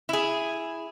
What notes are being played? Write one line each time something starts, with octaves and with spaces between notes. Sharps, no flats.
E4 G#4